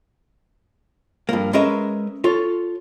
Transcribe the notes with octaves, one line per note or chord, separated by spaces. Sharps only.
G2 F3 A#3
G#3 C#4 A#4 B4 E5
F4 A4 C#5